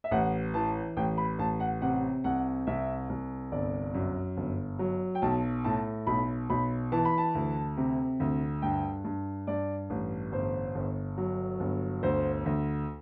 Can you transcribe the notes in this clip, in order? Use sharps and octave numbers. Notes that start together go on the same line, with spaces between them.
E5
A1 F#5
E3 A5
A1 G5
B5
A1 A5
F#5
C3 F#5
C2 F#5
C2 E5
C2
G1 D5
F#2
G1
F#3
G5
B1 A5
A2 A5
B1 B5
B1 B5
E3 A5
B5
A5
D2
C3
D2
G2 G5
G2
G2 D5
A1
G1 C5
G1
F#3
G1
D2 C5
D2